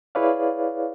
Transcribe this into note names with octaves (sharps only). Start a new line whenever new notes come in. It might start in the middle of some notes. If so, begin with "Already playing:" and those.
E4 G#4 B4 C#5 D5 F5